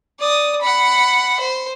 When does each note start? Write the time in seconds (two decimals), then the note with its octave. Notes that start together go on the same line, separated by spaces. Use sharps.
0.20 D5 D#6
0.62 F#5 B5
1.40 C5